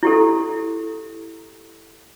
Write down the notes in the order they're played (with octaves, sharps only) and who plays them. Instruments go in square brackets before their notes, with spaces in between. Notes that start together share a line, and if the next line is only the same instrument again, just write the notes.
[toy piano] E4 G4 A4